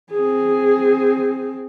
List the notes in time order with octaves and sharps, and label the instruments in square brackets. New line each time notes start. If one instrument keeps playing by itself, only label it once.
[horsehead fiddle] C4 G#4